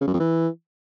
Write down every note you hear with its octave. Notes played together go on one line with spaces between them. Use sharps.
C#3
F#2
F2
E3